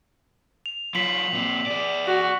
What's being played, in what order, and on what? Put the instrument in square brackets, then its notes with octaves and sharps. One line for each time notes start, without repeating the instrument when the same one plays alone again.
[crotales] F7
[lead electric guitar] F#3 F4 [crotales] B6 F#7
[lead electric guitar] A#2 C4
G#4 D5
[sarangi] F#4